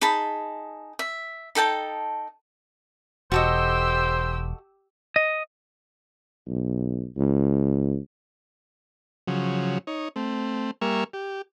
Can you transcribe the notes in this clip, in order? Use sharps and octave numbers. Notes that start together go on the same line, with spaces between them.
D#4 G#4 A5 B5
E5
D#4 A4 G5 A5
E1 F#4 G4 A4 C5 D#5 E6
D#5
B1
C#2
C#3 F3 F#3
D#4 C#5
A3 C4
G3 A#3 A#4 E5 G#5 C#6
G4